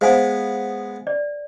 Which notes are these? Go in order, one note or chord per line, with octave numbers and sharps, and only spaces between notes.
G#3 B3 C5 F5 G#5
D5